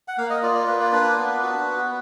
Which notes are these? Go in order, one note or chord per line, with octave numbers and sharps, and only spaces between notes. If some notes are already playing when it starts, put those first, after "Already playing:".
F#5
A#3 F5
D#5
F4 D5
D5
A#3 B4
D5
D4 B4
B3
F#4
B3